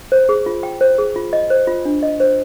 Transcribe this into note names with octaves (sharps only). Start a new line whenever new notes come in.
C5
G#4
F4
G5
C5
G#4
F4
D#5
C5
F4
D4
D#5
C5